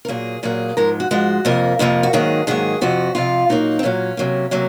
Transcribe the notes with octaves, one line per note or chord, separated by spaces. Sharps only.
A#4
A#2 F#3 A#3 G#4
A#2 F#3 A#3 G#4
G#2 F3 G#3 A#4
F#4
G#2 F3 G#3 F#4
F2 C3 F3 A#3 A#4
F2 C3 F3 A#3
F#4
G#2 D#3 F#3 A#3 G#4
G#2 D#3 F#3 A#3 G#4
F2 C3 F3 F#4
F2 C3 F3 F4
A#2 F#3 A#3 D#4
C4
A#2 F#3 A#3 C#4
C3 F#3 A#3
C3 F#3 A#3